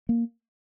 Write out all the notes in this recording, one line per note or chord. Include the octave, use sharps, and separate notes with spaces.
A#3